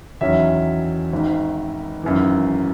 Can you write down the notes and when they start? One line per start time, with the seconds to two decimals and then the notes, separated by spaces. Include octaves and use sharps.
0.21 E2 D#3 F#3 C#4 E5
1.13 G#1 G#2 D#3
2.03 G#1 F#2 E3